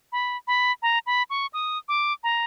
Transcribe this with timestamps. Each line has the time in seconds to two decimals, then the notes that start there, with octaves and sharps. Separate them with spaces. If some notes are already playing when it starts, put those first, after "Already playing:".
0.12 B5
0.47 B5
0.82 A#5
1.06 B5
1.30 C#6
1.53 D#6
1.88 D6
2.24 A#5